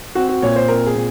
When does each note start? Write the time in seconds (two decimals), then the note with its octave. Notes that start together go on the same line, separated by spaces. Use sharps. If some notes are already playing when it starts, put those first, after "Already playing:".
0.15 C4 F#4
0.29 F#4
0.42 A#2 C#5
0.56 C5
0.68 C4 A#4
0.86 G#4
0.95 A#2